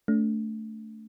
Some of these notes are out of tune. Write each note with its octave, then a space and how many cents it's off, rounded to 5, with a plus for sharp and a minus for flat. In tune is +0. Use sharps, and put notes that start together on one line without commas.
A3 +0 D4 -35